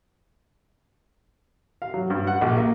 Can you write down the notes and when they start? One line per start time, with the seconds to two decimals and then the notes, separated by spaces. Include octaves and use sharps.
1.82 F5
1.94 F#3
2.10 G2
2.27 F#5
2.41 A#1
2.57 A#3